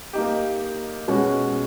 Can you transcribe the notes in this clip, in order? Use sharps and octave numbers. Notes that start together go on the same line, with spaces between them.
A#3 D#4 G4
B2 G#3 C#4 F#4